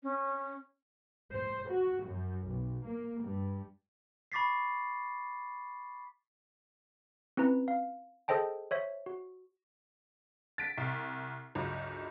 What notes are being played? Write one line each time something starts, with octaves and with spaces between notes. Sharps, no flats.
C#4
C5
F#4
F#2
B1
A#3
G2
B5 C#6 D6 A6 B6 C7
C4 C#4 E4 B4 A#5
F5
G#4 A4 C5 D#5 G5 A5
C5 C#5 E5
F#4
A6 B6 D7
C2
G1 C#2 F#3